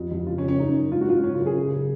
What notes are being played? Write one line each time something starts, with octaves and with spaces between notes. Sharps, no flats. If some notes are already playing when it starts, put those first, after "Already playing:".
Already playing: F2
F2
C#3 F4
C#4
C#3
C#4
F#2 D#4
F#2
G#2 F4
F#4
G#2 F4
C#3 C#4
F4
F#2
G#4
C#3
C#3